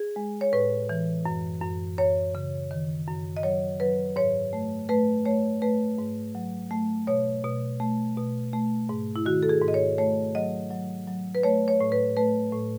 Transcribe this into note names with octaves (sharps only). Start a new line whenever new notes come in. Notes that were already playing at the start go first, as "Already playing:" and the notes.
Already playing: G#4
G#3
C#5
A2 B4
E3
F#2
F#2
F#2 C#5
C#3
D#3
F#2
D#5
F#3 C#5
F#3 B4
G#2 C#5
A3
A3 B4
A3 C#5
A3 B4
G#2
F#3
A3
B2 C#5
B2
A3
B2
A3
G#2
E4
D#3 F#4
A4
G#4
G#2
D#5
C#5
A3 C#5
F#3 D#5
F#3
F#3
B4
A3 C#5
C#5
A2
B4
A3 B4
A2